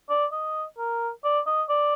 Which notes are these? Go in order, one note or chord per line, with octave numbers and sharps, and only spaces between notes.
D5
D#5
A#4
D5
D#5
D5